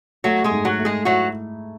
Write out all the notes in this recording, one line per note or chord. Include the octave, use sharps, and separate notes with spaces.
F#3 A3 F#4
G#3 G#4
G#2
F#3 F#4
A3
G#3 G#4
F#3 E4 F#4